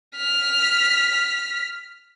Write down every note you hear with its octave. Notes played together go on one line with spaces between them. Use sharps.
F6 B6